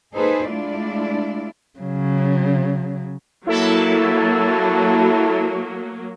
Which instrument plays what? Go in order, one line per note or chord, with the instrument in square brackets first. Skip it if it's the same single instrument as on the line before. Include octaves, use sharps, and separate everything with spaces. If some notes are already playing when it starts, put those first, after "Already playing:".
[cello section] A#3 D#4 G#4 A4 B4 C5
G#3 A3 D4 E4 F4 D5
[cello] C#3 F#3
[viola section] F#3 A#3 [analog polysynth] E4 A4 A5